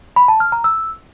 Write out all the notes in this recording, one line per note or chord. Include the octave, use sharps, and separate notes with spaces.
B5
A5
F6
A#5
E6